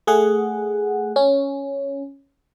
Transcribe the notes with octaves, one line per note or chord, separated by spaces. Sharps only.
A3 G#4 F#5
C#4